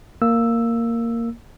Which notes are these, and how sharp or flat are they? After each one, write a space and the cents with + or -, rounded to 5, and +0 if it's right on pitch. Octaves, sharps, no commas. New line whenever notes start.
A#3 -10 E6 +0